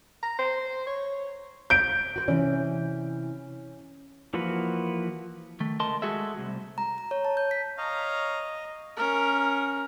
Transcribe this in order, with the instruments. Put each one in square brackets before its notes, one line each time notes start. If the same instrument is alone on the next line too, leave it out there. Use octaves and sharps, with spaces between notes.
[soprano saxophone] A#5
C5
C#5
[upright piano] G6 D7
[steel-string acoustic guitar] F#4 B4 C5
[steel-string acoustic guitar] C3 E3 [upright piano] C#4
[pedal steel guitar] E3 F3 A#3 F#4 B4
[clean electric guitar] D#3 A3
C#2 A3 A#4 D#5 A5 C6
G#3 A3 F#4 G#4 A4 E5
C2
[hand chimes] A#5
A#5
C#5
A5
G6
B6
[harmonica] C#5 F5 A#5 [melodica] D#5
[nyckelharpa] C#4 A#4